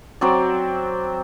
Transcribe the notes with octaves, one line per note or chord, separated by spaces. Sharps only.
F#3 C4 D5